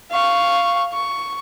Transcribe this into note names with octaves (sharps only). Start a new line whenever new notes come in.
F5 C#6
C#6